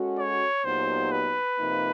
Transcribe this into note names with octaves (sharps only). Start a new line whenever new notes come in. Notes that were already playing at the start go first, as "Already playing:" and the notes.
Already playing: G#3 C#4 F#4 A4
C#5
A#2 F#3 B3 D#4 G4 C5
B4
C3 F3 A#3 D#4